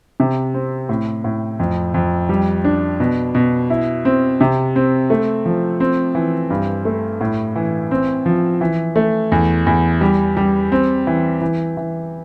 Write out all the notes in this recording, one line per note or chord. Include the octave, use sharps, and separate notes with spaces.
C3
C4
A2
A2
F2
F2
G3
D4
B2
B2
E4
C4
C3
C4
A3
F3
C4
E3
G2
A3
A2
E3
C4
F3
E3
A3
E2
E2
G3
G3
C4
E3
E3
E3